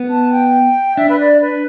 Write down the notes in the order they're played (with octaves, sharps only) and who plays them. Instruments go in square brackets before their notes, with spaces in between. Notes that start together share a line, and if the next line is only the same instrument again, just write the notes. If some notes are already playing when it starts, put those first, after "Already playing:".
Already playing: [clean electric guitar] B3
[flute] A5
G5
[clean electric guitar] D4 [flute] E5
[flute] B4
D5
B4